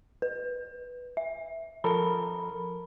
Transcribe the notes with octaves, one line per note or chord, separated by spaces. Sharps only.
B4
E5
F3 A4 A#4 B5